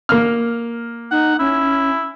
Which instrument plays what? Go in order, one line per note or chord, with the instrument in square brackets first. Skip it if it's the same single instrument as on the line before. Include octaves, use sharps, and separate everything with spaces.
[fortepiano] A#3 F6
[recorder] D#4 [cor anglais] F#5
[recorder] C#4 [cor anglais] E4